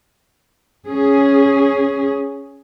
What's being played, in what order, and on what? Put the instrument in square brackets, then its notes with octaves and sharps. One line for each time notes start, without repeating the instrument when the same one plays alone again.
[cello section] C#4 G#4